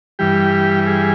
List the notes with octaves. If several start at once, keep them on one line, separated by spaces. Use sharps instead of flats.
G2 E3 G3 G4
G#4